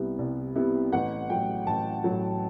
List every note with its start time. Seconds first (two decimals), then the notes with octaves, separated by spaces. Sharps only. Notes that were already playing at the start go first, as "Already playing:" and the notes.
Already playing: C2 C3 G3 B3 E4
0.19 C2
0.55 C3 G3 B3 E4
0.93 A1 F#5
1.30 A2 F#3 G5
1.67 A1 A5
2.04 F#3
2.09 A2